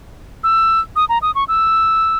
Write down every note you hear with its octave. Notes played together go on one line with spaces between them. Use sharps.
E6
D#6
A#5
D#6
C#6
E6